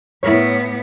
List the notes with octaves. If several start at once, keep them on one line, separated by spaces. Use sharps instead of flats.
A2 B3 E4 A#4 C#5